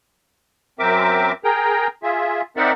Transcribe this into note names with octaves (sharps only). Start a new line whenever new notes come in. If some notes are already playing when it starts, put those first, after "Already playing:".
F#2 C4 A#4 E5 D6
G#4 A#4 G5 A#5
F4 G#4 E5
C4 D#4 A#4 D5 E5 F#5